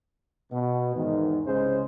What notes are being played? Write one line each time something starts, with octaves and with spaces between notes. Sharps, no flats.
B2
E2 G#2 D#3
C2 C#3 G#3 C5